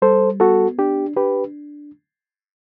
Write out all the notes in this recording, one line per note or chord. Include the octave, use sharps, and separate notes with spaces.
G3 A4 C5
B3 F#4 A4
D4 G4
D4 G4 B4